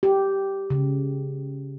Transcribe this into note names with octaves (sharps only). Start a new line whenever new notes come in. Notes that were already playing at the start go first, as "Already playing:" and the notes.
G4
C#3